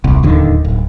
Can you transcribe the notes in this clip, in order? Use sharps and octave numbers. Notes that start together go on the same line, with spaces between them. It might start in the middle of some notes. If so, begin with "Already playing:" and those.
D#1 C2
D1 D#2 D3 D#3
D1